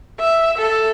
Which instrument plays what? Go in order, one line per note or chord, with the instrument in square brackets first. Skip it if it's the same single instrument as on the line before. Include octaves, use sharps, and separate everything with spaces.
[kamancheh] E5
A4